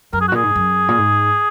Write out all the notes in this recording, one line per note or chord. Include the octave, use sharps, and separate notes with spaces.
F#2 A#4
G#4
F#4
A#2 G#4
G#2
F#2
A#2
G#2